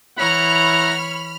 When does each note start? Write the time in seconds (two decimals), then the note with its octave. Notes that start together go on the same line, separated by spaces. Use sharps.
0.17 E3 E4 C#5 F#5 A#5 B5 F6